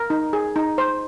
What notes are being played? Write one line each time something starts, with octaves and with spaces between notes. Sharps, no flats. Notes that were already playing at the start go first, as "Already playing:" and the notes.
Already playing: A#4
D#4
G#4
D#4
C5